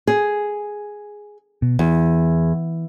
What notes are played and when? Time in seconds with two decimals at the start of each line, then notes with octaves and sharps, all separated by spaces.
0.07 G#4
1.62 B2
1.79 E2 E3